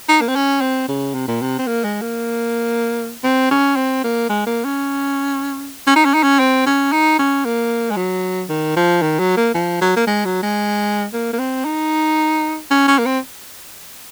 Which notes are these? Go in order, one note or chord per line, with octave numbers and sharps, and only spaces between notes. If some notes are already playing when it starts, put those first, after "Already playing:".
D#4
A#3
C4
C#4
C4
C#3
C3
A#2
C3
C4
A#3
G#3
A#3
C4
C#4
C4
A#3
G#3
A#3
C#4
C#4
D#4
C#4
D#4
C#4
C4
C#4
D#4
C#4
A#3
G#3
F#3
D#3
F3
D#3
F#3
A#3
F3
F#3
A#3
G#3
F#3
G#3
A#3
A#3
C4
D#4
C#4
C#4
A#3
C4